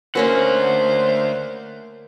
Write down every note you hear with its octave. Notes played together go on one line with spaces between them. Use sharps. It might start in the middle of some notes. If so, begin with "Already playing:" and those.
D2 A#3 C#4 F#4 A#4 C5 F#5